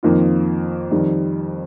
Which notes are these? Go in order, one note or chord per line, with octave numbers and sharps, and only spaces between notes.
F2 D#3 A#3 F4
F2 D#3 G3